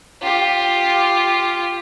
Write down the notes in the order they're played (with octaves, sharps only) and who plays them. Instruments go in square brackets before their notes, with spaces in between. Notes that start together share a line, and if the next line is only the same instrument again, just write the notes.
[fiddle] F4 G4